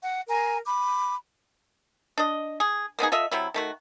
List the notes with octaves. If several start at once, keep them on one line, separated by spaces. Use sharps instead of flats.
F#5
A#4 G#5 A#5
B5 D6
D4 D#5
G#4
A#3 B3 D#4 G#4
F4 A4 D#5 E5
C3 F#3 E4
D#3 A3 F#4